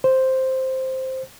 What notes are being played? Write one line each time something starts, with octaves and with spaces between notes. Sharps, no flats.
C5